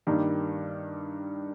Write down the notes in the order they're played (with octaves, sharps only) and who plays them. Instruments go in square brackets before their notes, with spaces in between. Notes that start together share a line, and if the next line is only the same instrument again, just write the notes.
[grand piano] G2 D#3 G3 A#3